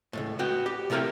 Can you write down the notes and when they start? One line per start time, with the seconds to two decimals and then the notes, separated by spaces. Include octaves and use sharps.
0.13 C#2 F#2 A2
0.39 B3 F#4 G5
0.66 G4
0.90 C3 A3 E4 A#4 F5 G5